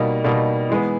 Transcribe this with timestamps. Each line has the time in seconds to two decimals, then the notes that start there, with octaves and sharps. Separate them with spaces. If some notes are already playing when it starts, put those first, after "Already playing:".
Already playing: B2 G3 A#3 D#4
0.24 B2 G3 A#3 D#4
0.70 E3 G#3 B3